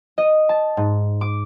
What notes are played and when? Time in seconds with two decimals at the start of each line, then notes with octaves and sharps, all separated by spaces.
0.18 D#5
0.49 A5
0.77 G#2
1.21 D6